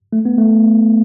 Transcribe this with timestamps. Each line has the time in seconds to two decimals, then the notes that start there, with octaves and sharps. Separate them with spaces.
0.13 A3
0.25 B3
0.38 A3